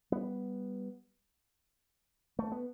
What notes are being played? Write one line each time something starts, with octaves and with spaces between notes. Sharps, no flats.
G3 B3
A3
B3